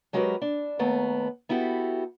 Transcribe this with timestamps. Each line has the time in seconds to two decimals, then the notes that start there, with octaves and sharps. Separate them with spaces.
0.13 F#3 G#3 F#4 G4 A#4 B4
0.42 D4
0.79 D#2 A3 B3 A#4
1.49 B3 E4 F#4 G4 A4